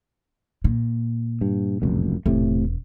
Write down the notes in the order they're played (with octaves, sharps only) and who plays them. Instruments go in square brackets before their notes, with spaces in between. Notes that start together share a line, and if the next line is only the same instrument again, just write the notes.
[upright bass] A#2
[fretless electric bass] G2
F1 C#2 F#2
[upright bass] E1 [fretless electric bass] A2 C3 A3